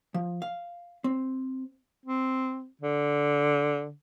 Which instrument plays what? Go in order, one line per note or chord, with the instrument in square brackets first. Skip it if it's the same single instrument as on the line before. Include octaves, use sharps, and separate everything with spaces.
[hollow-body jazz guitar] F3
F5
C4
[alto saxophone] C4
D3